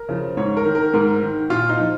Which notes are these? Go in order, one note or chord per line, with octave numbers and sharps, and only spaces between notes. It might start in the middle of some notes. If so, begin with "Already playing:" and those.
Already playing: A#4
C#3 F3
G#2 C#5
A#4
D#3
A#4
G#2 A#4
D#3
A#2 F4
D#4
F3